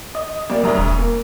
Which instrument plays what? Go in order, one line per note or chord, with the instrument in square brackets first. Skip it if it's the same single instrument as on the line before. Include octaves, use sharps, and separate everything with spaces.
[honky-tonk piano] D#5
C2 A#3 D5
[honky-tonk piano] D2 A#5 D#6 [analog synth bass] G3
[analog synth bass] E1
[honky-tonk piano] A#3